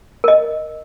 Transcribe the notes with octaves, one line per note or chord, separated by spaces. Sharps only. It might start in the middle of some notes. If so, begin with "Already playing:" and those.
A#4 D#5